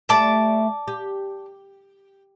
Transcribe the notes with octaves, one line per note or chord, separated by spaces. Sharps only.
G3 A3 D5 A5 D6
G4